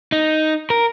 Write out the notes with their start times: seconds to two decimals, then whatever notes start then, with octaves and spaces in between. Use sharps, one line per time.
0.12 D#4
0.70 A#4